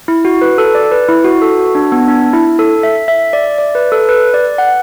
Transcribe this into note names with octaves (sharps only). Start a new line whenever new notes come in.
E4
F#4
B4
A4
D5
B4
E4
F#4
A4
F#4
D4
B3
D4
E4
A4
E5
E5
D5
D5
B4
A4
B4
D5
F#5